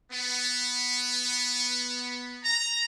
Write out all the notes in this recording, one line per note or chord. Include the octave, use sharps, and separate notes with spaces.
B3
A#5